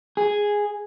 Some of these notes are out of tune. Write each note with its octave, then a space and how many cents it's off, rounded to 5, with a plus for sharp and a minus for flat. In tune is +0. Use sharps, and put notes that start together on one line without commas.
G#4 -5